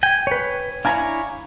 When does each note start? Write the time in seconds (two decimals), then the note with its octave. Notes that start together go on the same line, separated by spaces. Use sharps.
0.03 G5 G#5
0.27 B4 C#5
0.85 D4 E4 C#5 F5 G#5 A#5